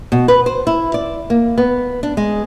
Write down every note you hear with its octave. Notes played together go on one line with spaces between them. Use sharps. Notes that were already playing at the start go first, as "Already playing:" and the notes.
B2
B4
C5
E4
D5
A#3
B3
D4
G#3